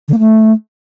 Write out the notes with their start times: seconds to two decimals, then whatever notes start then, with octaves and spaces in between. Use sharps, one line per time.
0.08 D3
0.14 A#3
0.19 A3